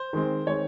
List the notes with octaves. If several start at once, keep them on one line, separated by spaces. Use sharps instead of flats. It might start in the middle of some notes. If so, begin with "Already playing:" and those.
Already playing: C5
D#3 G#3 C4
D#3 G#3 C4 C#5